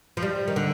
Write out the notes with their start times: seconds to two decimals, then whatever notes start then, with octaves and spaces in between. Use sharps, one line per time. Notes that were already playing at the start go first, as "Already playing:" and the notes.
0.17 F3
0.22 G3
0.48 D#3
0.56 D3